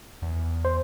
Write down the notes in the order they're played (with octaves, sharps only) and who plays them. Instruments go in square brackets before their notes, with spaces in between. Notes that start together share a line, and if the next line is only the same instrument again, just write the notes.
[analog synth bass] E2
[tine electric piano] C5